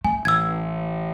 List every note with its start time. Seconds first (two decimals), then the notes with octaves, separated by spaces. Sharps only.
0.05 A3 G#5
0.25 A1 E6 G#6